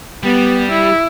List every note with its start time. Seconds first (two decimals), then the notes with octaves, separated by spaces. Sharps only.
0.23 G3 B3
0.71 E4